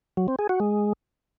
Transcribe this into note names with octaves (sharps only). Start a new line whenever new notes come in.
F#3
C4
G#4
F#4
G#3